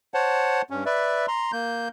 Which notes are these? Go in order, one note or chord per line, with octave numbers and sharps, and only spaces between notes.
C5 C#5 F#5 A5
G2 C#4
B4 D5 E5
A#5 C6
A#3 G6